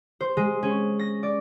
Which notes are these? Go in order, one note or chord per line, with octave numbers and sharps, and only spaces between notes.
C5
G#3
C#4
A#6
D5